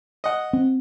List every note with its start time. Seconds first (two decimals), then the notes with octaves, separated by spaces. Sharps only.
0.24 D#5 F#5
0.53 C4